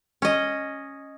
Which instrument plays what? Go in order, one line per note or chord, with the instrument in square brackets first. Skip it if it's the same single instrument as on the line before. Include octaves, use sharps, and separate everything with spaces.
[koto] C#4 D#5